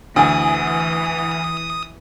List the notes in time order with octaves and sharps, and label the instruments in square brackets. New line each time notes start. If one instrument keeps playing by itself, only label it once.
[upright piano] D2 [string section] E3 [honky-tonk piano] F#5 G#5 [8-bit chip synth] D#6